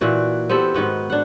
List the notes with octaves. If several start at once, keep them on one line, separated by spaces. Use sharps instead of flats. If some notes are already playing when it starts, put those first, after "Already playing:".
A#2 E3 F#4 D5
B3 C4 G4 A4
G#2 D#3 B3 F#4
D4 F#5